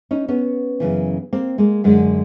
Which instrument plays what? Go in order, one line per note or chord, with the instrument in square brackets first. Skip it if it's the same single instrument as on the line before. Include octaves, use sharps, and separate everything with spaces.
[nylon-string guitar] C#4 D#4
B3 C#4
F#2 C#3 E3
A#3 C4
G#3 A#3
F#2 D3 G#3